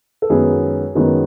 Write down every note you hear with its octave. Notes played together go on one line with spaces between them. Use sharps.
A4
F#2 D#3 G#3 B3 G#4
F#2 D#3 G#3 B3